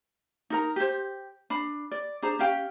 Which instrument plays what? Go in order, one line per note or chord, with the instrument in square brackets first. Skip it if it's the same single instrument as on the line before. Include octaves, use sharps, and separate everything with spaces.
[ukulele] D#4 A#4 A#5
G4 C5
D4 B5
D5
D4 G#4 C5 A#5
C#4 G4 F5 G5